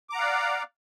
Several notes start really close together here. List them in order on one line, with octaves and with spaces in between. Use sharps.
D6 A#5 F#5 F5 D5